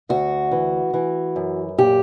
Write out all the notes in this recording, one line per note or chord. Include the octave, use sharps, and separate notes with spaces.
D2 F#4
E3
E3
F#2
A#2 G4